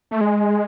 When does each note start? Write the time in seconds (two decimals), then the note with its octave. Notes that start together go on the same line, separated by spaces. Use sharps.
0.11 A3
0.21 G#3